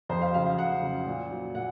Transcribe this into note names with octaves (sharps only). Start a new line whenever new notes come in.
F2 C5
F5
C#3 F#3 F5
F5
F2 F#5
C#3 F#3
A#2
F#3
A#2 F#5